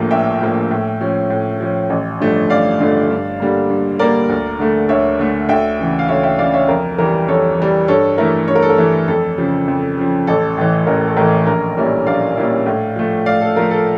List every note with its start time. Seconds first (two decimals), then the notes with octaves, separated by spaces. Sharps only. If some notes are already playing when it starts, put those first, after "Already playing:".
Already playing: A#1 A2 F3 A#3
0.11 A#1 E5 G5
0.41 A2 F3 A#3
0.71 A2
1.01 F3 C#4
1.30 A2
1.60 F3 C#4
1.90 A1
2.20 G2 D3 F3 A3
2.50 A1 D5 F5
2.80 G2 D3 F3 A3
3.10 G2
3.40 D3 G3 A#3
3.70 G2
3.99 D3 G3 A#3 A#4 D5
4.29 D2
4.59 D3 A3
4.89 D2 C#5 E5
5.19 D3 A3
5.49 D2 E5 G5
5.79 C#3 E3
5.99 F5
6.09 D2 C#5 E5
6.23 E5 G5
6.39 C#3 E3 D5 F5
6.54 C#5 E5
6.68 F2 A#4
6.98 E3 G3 A#4
7.28 F2 A4 C#5
7.58 E3 G3
7.88 G2 A4 C#5
8.18 E3 A3 E4 A#4
8.47 G2 C#5
8.55 A#4
8.62 A4
8.70 A#4
8.78 E3 A3 E4
9.08 F2 A4
9.38 C#3 F3
9.68 F2
9.97 C#3 F3
10.27 A1 A4
10.58 A2 E3
10.87 A1 A#4
11.07 A4
11.17 A2 E3 A#4
11.47 A#1 A#4
11.77 A#2 G3 C#4 E4
12.06 A#1 D5 F5
12.37 A#2 G3 C#4 E4
12.66 A2
12.96 F3 A3
13.26 A2 D5 F5
13.41 A4
13.56 F3 A3 A#4
13.71 A4